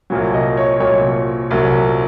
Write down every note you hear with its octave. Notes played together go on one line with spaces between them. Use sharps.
C2 A#2 F#3
D#5
C#5
C2 A#2 F#3 C#5
C2 A#2 F#3